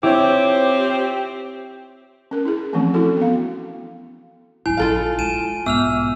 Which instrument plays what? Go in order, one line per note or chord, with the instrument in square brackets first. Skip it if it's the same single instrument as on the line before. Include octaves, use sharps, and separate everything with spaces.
[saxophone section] F3 C4 [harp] E4 [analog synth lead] G4 [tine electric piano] C#5 D6
[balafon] C#4 A#4
E4 G#4
E3 F3 A3 C4 C#4
E4 F#4 A4
B3 F5
[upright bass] G#2 F#3 [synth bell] E4 [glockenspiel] G#5
[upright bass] A#1 F#3 [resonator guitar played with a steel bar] F4 A4 F5
[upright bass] G#3 [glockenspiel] G#5 D#7 E7
[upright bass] B1 G#2 [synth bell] B3 [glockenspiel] E6 F6 F7